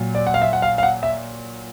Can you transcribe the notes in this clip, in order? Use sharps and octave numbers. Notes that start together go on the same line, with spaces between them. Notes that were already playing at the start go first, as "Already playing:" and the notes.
Already playing: A#2 F#3
D5
F#5
F5
E5
F#5
F5
F5
F#5
E5